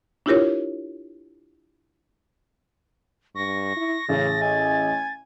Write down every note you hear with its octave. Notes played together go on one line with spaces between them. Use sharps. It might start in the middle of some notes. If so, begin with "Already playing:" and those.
D4 E4 F4 G4 A#4 C#5
G2 C#6 A#6
E4
A1 C#3 G#4 A6
D#5 G#5